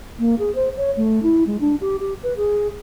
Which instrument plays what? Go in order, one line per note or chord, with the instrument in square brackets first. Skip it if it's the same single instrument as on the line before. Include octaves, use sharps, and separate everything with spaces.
[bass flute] A#3
G#4
C5
C#5
A3
E4
G#3
D4
G4
G4
B4
G#4